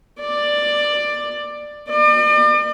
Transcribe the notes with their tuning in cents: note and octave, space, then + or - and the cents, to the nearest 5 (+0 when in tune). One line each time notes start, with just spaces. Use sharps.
D5 +10
D5 +40